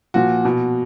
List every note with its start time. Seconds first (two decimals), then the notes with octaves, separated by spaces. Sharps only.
0.14 A#2 F3 F#4
0.45 B2